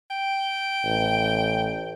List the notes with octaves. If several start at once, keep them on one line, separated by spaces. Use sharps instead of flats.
G5
A1